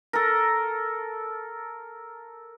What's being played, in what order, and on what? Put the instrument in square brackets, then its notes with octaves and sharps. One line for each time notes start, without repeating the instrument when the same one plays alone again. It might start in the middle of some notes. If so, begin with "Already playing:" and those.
[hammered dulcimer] A4 A#4